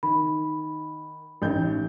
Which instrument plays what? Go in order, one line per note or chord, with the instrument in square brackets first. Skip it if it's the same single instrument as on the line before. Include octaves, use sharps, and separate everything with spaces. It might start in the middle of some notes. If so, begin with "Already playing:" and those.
[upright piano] D#3 [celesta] B5
[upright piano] A1 D#4 G6